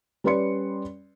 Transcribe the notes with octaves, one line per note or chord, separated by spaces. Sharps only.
G3 C#4 B4 D5 C6 C#7